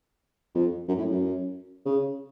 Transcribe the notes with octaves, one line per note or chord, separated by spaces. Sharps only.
F2
F#2
A2
F#2
C#3